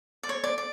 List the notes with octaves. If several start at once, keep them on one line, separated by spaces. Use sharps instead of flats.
D5
C#5
D5
D5